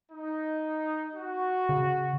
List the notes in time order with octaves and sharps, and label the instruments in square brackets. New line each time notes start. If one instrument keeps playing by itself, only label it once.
[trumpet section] D#4
F#4
[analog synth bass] C#3